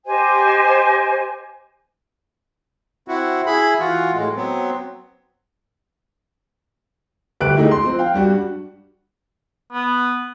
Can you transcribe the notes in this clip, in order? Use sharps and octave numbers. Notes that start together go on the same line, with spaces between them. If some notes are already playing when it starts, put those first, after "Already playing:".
G4 C5 D#5 G#5
C4 E4 F#4
E4 G#4 B5
E3 F4 F#4
A2 G#3
F#3 B3 C4
G1 D2 G4 B4 F#6 D7
G2 G#3 A3 D#4 E4
C6
F3 C4
F5 G5
G2 G3 F#4
B3